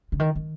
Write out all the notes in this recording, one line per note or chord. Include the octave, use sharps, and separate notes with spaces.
D3
D#3
D#3